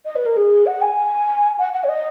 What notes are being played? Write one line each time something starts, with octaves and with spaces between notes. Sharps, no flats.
D#5
B4
A#4
G#4
F#5
G#5
F#5
F#5
C#5
D#5